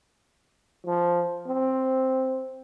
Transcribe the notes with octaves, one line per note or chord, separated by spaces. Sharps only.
F3
C4